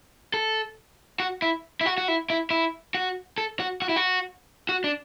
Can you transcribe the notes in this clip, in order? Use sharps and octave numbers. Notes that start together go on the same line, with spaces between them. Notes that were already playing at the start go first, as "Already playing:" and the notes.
A4
F#4
E4
E4
F#4
F#4
E4
E4
E4
F#4
A4
F#4
F#4
E4
F#4
F#4
D4